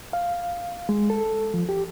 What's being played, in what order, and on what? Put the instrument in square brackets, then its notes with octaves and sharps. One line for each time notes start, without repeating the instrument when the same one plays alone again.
[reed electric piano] F5
G#3
A4
F3
G4